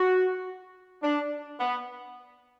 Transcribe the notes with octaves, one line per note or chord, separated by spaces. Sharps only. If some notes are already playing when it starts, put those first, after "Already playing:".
Already playing: F#4
D4
B3